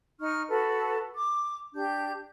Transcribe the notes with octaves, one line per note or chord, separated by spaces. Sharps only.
D#4 C#6 F6
F#4 A4 B4
D6
D4 G4 G6